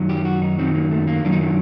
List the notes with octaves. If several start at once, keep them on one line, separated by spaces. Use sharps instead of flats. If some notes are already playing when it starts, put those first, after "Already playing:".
Already playing: F#2 D#3 F#3
G4
F#4
D#4
F#2 D#3 F#3 C4
A#3
A3
A#3
F#2 D#3 F#3 D4
D#4
D4